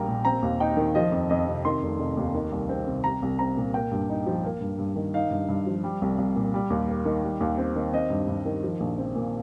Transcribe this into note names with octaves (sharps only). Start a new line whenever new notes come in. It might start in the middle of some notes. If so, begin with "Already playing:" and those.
Already playing: A#1 G3 A#3 G5 A#5
A#2
C4 A#5
D#2
D#4 G5
D#3
F3 D#5
F2
F2 D#5
C3
D#3 C6
F1
F1
D#2
D#3
C2
C4
C3
G3 A#5
C2
C4 A#5
A#2
A#3 G5
G2
D#4
F3
A#3
G2
G2
D#3
D#4 F5
G2
G2
F3
G3
C2
C2
A#2
G3
D#2
A#3
D#3
G3
D#2
C4
D#3
C4 D#5
G2
G2
D#3
F3
A#1
C4
A#2